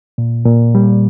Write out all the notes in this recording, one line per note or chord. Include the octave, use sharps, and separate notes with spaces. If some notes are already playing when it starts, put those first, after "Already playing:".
A#2
A#2
G3